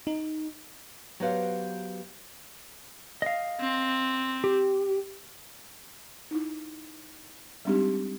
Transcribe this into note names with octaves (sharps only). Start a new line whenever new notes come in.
D#4
F#3 B3 G4 B4 C5 F5
D#5 F5
C4
G4
D#4 E4
G3 G#3 C4 D4 D#4 G4